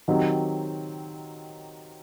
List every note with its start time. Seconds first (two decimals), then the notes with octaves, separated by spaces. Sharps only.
0.08 D#3 F#3 C4 D#4 G4